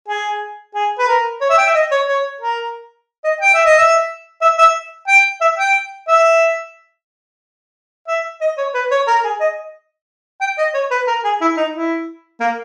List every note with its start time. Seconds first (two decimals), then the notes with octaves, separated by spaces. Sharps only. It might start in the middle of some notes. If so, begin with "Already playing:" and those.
0.08 G#4
0.75 G#4
0.99 B4
1.08 A#4
1.41 C#5
1.50 E5
1.58 G5
1.66 E5
1.75 D#5
1.91 C#5
2.08 C#5
2.41 A#4
3.24 D#5
3.41 G5
3.54 E5
3.65 D#5
3.78 E5
4.42 E5
4.58 E5
5.08 G5
5.41 E5
5.58 G5
6.08 E5
8.08 E5
8.41 D#5
8.58 C#5
8.74 B4
8.91 C#5
9.07 A#4
9.24 G#4
9.41 D#5
10.41 G5
10.58 D#5
10.74 C#5
10.91 B4
11.07 A#4
11.24 G#4
11.41 E4
11.57 D#4
11.74 E4
12.40 A#3